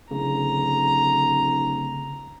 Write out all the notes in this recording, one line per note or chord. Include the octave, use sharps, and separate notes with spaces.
D1 C#3 A#5